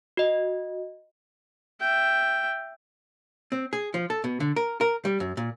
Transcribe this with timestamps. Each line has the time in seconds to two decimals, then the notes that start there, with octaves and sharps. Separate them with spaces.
0.17 F#4 D#5
1.80 E5 G5
3.52 C4
3.73 G#4
3.94 F3
4.10 A4
4.24 B2
4.40 D3
4.56 A#4
4.81 A#4
5.05 G3
5.20 F#2
5.37 A#2